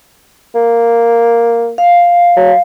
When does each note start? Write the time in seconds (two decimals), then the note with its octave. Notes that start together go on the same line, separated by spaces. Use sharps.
0.55 A#3
1.78 F5
2.36 F#3